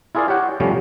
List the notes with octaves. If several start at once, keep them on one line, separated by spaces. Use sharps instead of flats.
E4 F4 G#4 A#4 D5 F5
G4 C#5 F#5 G5
C3 F3 G3 A3 C#4